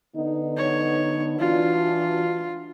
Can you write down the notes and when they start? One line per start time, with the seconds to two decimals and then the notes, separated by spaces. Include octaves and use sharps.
0.16 D3 B3 D#4
0.57 C#5
1.39 E3 D4 F4 F#4